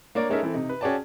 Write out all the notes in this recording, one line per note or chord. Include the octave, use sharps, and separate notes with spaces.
A#3 D4 A#4 C#5 D5
G#3 C#4 D#4 A4 A#4 E5
E3 C4 E4 A4
C3 D#4
B4
C#4 F#4 G#4 D5 G5 A5